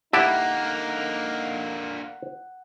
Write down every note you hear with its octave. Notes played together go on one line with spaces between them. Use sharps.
D3 A#3 D#4 E4 G4 F#5 A5